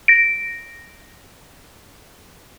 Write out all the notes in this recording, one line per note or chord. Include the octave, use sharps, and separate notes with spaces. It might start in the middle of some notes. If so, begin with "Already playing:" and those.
A#6 D7